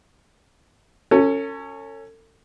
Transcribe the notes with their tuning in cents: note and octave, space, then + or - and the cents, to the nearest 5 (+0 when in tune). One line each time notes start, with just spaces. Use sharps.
C#4 +0 A4 +40